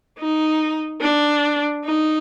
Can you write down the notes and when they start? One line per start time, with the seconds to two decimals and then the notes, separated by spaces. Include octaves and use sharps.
0.19 D#4
1.02 D4
1.85 D#4